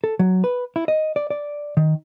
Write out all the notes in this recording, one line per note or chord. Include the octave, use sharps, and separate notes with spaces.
A4
F#3
B4
E4
D#5
D5
D5
D#3